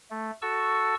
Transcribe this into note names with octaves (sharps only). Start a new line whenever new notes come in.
A3
F#4 A4 A5 C#6 E6